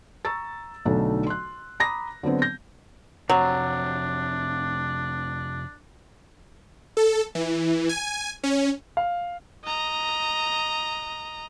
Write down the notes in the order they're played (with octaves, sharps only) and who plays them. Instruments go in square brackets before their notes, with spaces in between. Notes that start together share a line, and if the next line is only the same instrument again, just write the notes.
[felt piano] A#5 C#6 E6 A6
B1 D3 A3 D#4 A4
C6 F#6
A#5 B5 D6 D#6 A#6
D3 F#3 B3 C4
G6 A#6
[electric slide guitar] F2 C3 [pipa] F#3 [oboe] D4
[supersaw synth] A4
E3
G#5
C#4
[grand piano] F5
[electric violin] D#5 A#5